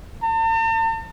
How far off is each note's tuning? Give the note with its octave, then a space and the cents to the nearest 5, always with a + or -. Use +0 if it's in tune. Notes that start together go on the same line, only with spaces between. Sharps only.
A5 +45